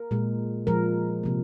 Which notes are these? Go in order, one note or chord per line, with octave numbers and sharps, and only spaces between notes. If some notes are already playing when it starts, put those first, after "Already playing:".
Already playing: A#4
A#2 G#3
A#2 F3 G#3 A#4
C3 F3 A#3